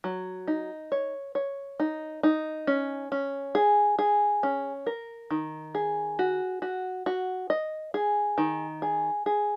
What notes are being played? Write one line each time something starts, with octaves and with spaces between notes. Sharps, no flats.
F#3
D#4
C#5
C#5
D#4
D#4
C#4
C#4
G#4
G#4
C#4
A#4
D#3
G#4
F#4
F#4
F#4
D#5
G#4
D#3
G#4
G#4